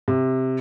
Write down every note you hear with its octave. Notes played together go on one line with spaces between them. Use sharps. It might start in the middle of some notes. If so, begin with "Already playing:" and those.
C3